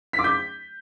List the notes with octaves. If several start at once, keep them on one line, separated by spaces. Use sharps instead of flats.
B6
D6
G6